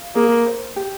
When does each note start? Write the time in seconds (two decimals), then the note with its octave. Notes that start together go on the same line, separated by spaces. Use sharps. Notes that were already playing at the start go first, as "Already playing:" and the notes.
Already playing: F5
0.15 A#3 G#4
0.46 C5
0.76 G4